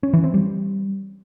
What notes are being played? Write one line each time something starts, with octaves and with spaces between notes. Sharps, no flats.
C#4
E3
C4
G3